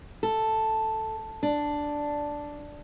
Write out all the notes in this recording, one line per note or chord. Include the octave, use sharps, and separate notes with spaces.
A4
D4